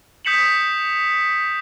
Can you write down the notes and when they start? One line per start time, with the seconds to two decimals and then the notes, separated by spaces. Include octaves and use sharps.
0.25 D#6 G6 B6 C#7 E7 F#7